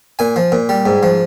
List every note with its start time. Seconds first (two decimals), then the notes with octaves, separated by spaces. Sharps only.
0.19 A#2 G#5
0.36 F3
0.52 A#2
0.69 G3
0.86 G#2
1.03 F3